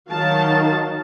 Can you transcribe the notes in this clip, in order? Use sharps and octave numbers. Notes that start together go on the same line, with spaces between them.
D#3 F#3 D#4 F5 A5